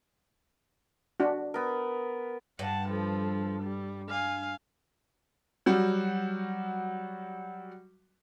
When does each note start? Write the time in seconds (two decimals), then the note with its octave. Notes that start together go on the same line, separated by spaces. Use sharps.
1.20 D4 F#4
1.54 B3 A#4
2.59 G2 F#5 A5
2.89 F3 A4
3.62 G3
4.09 F5 G#5
5.66 F#3 G3 F#4